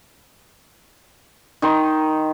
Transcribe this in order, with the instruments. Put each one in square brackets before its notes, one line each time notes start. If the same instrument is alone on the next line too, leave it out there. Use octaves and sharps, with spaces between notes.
[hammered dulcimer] D#3 D#4 C6